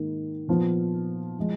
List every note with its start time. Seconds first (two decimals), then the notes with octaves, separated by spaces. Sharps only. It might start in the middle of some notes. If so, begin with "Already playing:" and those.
Already playing: G#2 D#3 A#3
0.48 A#2 F3 B3 F4
1.39 F3 G#3